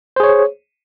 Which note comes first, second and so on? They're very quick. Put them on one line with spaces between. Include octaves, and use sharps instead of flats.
C5 G#4 C#5